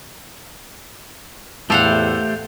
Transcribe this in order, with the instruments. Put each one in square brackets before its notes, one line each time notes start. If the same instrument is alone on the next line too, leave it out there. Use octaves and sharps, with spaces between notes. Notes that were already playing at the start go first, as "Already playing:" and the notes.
[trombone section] E2 A2 [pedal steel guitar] A3 G4 C5 [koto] A4 F5 F#5